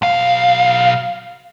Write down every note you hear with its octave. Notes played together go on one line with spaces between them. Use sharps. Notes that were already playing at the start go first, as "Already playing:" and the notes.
B1 F5